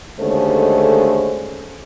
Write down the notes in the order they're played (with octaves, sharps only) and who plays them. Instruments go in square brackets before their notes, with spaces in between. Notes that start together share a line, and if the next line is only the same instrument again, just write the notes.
[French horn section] D#2 D3 G#3 A3 C#4 C5